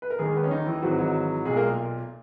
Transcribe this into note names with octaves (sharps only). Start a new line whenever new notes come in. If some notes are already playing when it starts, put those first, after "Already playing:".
B4
A#4
D#2 D#3 G#3 G#4
B3
C#4
D#3 D#4
E3 E4
G#1 G#2 E3 F#3 F#4
F#3 F#4
B1 A#2 G#3 G#4
A#3 A#4